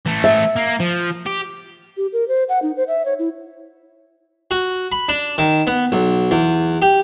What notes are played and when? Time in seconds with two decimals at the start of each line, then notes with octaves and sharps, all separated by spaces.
0.06 E3 A3
0.24 E5
0.56 A#3
0.80 F3
1.26 G4
1.97 G4
2.13 A#4
2.28 C5
2.49 F#5
2.62 D#4
2.77 C5
2.88 E5
3.05 C#5
3.19 E4
4.51 F#4
4.92 B5
5.09 D4
5.38 D#3
5.67 B3
5.92 B1
6.31 E2
6.82 G4